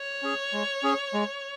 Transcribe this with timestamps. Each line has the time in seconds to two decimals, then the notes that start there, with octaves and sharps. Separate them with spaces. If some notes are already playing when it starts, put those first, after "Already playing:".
Already playing: C#5
0.23 C#4 G#4
0.53 G#3
0.83 C#4 G#4
1.13 G#3